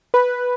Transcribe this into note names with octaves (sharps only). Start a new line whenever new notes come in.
B4